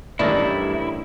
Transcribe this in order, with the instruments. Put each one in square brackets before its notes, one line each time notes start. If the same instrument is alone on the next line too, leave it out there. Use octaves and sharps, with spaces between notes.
[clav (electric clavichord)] A1 D#3 E3 [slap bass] G2 [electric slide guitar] E4 [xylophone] D5 A5 B6